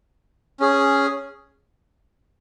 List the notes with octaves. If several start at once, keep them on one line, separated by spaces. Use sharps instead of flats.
C#4 G#4